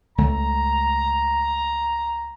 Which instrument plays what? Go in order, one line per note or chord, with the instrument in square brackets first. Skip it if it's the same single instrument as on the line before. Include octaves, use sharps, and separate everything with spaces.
[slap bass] C#2 A3 [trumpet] A#5